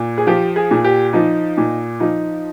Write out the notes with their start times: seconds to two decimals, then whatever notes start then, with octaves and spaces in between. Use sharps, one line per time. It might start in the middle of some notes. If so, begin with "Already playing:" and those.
Already playing: A#2
0.18 G#4
0.27 F3 G4
0.56 G#4
0.71 A#2
0.84 G4
1.13 F3 D#4
1.58 A#2
2.00 F3 D#4